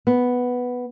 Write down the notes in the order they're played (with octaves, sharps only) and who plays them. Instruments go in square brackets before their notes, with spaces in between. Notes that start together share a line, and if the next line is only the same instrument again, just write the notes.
[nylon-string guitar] B3